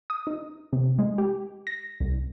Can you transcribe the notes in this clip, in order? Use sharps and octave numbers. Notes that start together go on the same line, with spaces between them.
D#6
D#4
C3
G#3
G4
A#6
C2